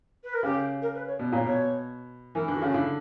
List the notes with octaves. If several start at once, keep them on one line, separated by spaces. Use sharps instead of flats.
B4
A#4
C#3 G4
A#4
B4
C#5
B2 D5
A#2 C#5
B2 C#5
E3 A#4
D3
F#4
C#3
F#4
D3 E4